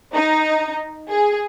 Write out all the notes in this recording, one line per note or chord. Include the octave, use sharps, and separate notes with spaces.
D#4
G#4